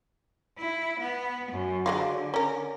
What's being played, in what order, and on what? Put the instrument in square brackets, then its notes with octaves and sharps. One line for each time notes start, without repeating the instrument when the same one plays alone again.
[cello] E4
B3
F#2
[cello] D3 [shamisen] F#3 G#3 F4
[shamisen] C#4 A#4